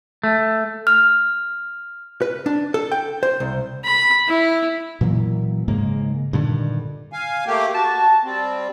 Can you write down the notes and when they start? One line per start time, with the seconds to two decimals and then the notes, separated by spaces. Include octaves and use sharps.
0.23 A3
0.87 F6
2.22 B4
2.46 D4
2.74 A4
2.92 G5
3.23 C5
3.40 C2
3.84 B5
4.28 E4
5.01 A#2 E3 F#3 A#3
5.68 G#2 C#3 G#3 A#3
6.33 G2 A#2 D3 D#3
7.13 F5 G#5
7.46 A3 A#3 G4
7.74 F#4 A5
8.24 G3 C4